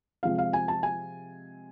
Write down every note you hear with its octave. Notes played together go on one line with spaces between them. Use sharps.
C3 F3 G#3 C4 F5
F5
G#5
A5
G#5